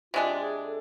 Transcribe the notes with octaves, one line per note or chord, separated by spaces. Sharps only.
C3 G#3 D4 F4
G#4
A4